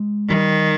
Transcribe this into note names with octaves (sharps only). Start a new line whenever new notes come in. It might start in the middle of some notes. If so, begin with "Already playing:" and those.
Already playing: G#3
D#3 G3